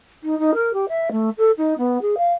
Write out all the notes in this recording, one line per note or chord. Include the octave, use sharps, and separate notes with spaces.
D#4
D#4
A#4
G4
E5
A3
A4
D#4
B3
G#4
F5